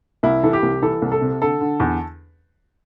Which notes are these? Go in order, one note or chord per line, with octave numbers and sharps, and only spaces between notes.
C2 E4
E3 A4
G4
C2
E3 A4
C2
A4
C3
D3 A4
D3
E2